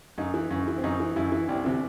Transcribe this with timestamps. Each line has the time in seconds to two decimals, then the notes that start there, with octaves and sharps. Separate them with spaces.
0.18 F#2 D#4
0.34 E3
0.51 F#2
0.68 E3
0.78 C4
0.84 F#2 D#4
1.00 E3
1.16 F#2 E4
1.32 E3
1.49 C2
1.65 C3 E3